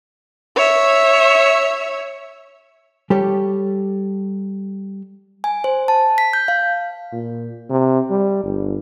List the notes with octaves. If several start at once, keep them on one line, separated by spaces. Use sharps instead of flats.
C#5 E5
G3 G4 A4 C#5
G#5
C5
A5
B6
G6
F5
A#2
C3
G3
G1